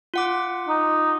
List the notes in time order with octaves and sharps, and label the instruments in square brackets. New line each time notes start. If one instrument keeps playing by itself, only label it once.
[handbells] F4 F#5 D6
[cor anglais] D#4